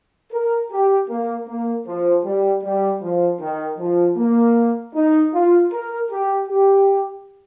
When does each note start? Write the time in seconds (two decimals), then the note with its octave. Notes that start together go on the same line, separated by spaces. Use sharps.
0.32 A#4
0.70 G4
1.08 A#3
1.47 A#3
1.86 F3
2.23 G3
2.63 G3
3.02 F3
3.39 D#3
3.79 F3
4.17 A#3
4.94 D#4
5.33 F4
5.71 A#4
6.10 G4
6.48 G4